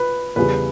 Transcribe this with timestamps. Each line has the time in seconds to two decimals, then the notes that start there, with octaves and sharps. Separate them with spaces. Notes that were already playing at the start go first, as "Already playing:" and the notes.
Already playing: B4
0.36 E2 C#3 G3 B4